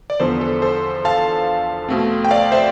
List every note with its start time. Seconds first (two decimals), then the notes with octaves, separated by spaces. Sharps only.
0.10 D5
0.20 E2 D3 F3 B3 A4 C5
0.41 A4
0.62 A4 C5
1.05 F5 A5
1.88 B2 A3 C4
2.25 G5
2.31 D5 F5
2.52 C5 E5